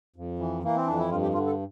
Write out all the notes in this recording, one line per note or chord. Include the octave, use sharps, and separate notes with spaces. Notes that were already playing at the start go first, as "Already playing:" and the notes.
F2
E3
E3 A#3
C4
F2 D4
E4
G2 F4
G4
D3 F4
A4